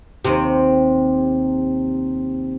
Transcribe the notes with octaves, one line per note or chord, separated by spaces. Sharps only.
D#2 C3